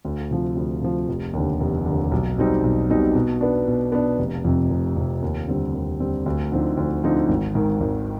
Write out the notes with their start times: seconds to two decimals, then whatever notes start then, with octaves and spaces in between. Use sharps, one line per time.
0.05 D2
0.31 C3 F3
0.56 D2
0.82 C3 F3
1.09 F1
1.33 D#2 D3
1.60 F1
1.85 D#2 D3
2.11 B1
2.38 B2 G3 C4 D#4
2.64 B1
2.89 B2 G3 C4 D#4
3.15 B2
3.41 B3 D4
3.67 B2
3.92 B3 D4
4.19 F1
4.44 F2 C3
4.70 F1
4.96 F2 C3
5.22 D#2
5.48 D3 G3 C4
5.74 D#2
6.00 D3 G3 C4
6.26 D2
6.52 D3 F3 C4 D#4
6.77 D2
7.04 D3 F3 C4 D#4
7.29 G#1
7.55 G#2 D#3
7.80 G#1